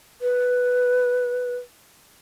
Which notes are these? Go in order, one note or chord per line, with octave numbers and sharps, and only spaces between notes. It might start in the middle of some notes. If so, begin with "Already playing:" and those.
B4